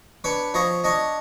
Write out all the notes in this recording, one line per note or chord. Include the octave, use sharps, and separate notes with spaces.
D4 B4 C#5
F3 C#5 D#5
D4 C#5 D#5